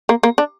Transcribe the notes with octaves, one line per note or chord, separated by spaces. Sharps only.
A#3
A#3
D4